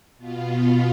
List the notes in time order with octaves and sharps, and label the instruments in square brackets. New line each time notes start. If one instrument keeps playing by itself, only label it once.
[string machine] B2 B3 F4